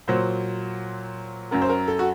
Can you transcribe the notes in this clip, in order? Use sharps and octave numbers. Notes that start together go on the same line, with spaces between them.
A#2 F#3 C5
F#2 F#3 A#4
C5
A#4
A4
F#4